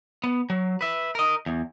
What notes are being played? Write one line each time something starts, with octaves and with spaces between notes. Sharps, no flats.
B3
F#3
B4 E5
A#4 D#5
E2